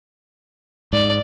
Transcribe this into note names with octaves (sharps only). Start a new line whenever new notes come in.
G#2 D5